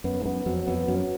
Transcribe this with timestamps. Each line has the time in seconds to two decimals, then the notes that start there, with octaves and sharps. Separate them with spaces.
0.04 F#2 B3
0.21 G#2
0.26 F#2 B3
0.46 F2 F#3
0.67 F2 B3
0.88 F#2 F#3